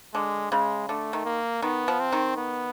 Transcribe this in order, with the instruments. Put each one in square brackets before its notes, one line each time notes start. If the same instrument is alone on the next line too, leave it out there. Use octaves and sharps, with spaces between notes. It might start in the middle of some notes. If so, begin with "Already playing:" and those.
[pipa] D3 [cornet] G#3
[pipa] C#3 [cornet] G#3
[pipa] D3 [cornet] A3
[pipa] D#3
[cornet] A#3
[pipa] D#3 [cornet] B3
[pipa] F3
[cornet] C4
[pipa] D#3
[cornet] B3